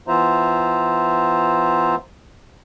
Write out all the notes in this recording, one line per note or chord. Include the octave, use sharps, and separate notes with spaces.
E3 B3 F4 C5 E5 A#5